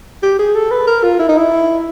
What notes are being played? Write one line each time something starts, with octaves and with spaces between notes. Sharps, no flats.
G4
G#4
A4
B4
A#4
F4
E4
D#4
E4